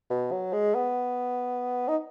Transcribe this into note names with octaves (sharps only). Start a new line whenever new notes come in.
B2
F#3
G#3
B3
D#4